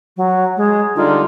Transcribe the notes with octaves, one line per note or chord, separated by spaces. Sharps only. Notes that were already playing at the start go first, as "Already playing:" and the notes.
F#3
G#3
D3 G3 D#4 F4